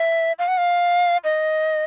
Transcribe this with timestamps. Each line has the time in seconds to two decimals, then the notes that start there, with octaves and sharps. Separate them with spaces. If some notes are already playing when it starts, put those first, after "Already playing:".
Already playing: E5
0.39 F5
0.48 F#5
0.58 F5
1.24 D#5